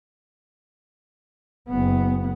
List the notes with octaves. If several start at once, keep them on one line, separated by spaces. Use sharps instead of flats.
F#1 B3